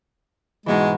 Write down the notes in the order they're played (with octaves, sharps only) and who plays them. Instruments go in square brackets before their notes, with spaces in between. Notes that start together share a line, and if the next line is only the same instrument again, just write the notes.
[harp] G#2 B2 E3 [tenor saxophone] G#3